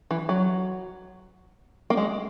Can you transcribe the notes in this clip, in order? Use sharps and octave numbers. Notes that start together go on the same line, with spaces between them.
E3
F#3
A#3
G#3